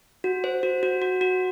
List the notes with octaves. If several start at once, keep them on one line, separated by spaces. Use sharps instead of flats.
F#4
C5
F#4
F#4
F#4
F#4